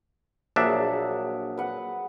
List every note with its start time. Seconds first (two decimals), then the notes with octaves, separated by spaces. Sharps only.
0.56 A#1 F#3 D4 G#4 E5
1.58 B4 F#5